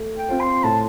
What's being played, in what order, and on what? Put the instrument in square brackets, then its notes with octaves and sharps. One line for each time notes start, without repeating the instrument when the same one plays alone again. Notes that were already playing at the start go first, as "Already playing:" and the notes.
Already playing: [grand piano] A3
[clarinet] G5
[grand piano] C4 F4 C5
[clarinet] C6
[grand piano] A2 [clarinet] A5